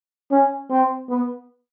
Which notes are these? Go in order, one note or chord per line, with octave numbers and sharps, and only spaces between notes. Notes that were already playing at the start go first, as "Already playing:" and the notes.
C#4
C4
B3